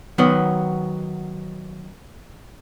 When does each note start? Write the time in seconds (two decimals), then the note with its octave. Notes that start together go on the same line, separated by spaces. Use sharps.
0.18 D#3 F#3 B3